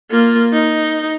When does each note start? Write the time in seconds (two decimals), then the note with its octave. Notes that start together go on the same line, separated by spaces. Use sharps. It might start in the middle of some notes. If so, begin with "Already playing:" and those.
0.11 A#3 F4
0.53 D#4